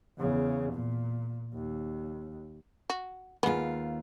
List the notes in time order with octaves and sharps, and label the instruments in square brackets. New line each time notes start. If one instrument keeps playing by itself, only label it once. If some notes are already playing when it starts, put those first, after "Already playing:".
[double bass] E2 C#3
A#2
D#2
[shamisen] F#4
[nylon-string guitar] D#2 F4 [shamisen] G#3 B3